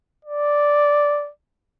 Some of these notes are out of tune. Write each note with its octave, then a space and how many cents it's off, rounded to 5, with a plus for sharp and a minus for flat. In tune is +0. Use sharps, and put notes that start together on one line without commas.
D5 -5